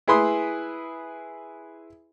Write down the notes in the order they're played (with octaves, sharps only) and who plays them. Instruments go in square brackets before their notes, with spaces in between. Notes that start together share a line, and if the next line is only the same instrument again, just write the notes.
[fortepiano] E4 G#4 B4 B5 C6 D#6